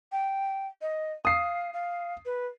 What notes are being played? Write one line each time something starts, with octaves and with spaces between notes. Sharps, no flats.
G5
D#5
F5 D#6 C7
F5
B4